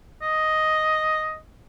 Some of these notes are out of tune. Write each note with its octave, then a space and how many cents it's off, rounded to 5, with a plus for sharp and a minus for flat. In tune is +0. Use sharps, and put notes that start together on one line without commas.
D#5 +5